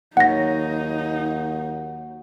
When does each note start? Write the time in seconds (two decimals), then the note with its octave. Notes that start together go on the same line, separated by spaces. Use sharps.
0.17 D#2 F#3 D#4 F#4 F#5 A#6